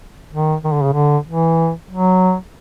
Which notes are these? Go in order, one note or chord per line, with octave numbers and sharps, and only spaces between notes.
D#3
D#3
D3
C#3
D3
E3
F#3